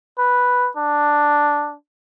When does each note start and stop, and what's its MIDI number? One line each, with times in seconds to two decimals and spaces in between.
0.18 0.69 71
0.77 1.75 62